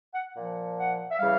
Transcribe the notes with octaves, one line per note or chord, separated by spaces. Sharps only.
F#5
A#2 F3
F#5
E5
C#3 E3 G3 F5